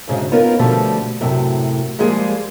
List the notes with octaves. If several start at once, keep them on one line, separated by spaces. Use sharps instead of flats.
D2 G#2 C#3
B3 C#4 D#4 F4 A#4
B2 D3 F3 G3 A3
F#2 A2 C3 F#3
F3 G3 G#3 A#3 G#4